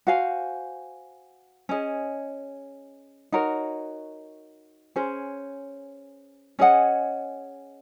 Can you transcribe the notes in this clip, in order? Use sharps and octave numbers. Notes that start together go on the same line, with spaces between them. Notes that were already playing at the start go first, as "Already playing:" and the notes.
F#4 C5 F5 G#5
C#4 G#4 D#5
D#4 F#4 A#4 C#5
C#4 G#4 C5
C#4 G#4 D#5 F#5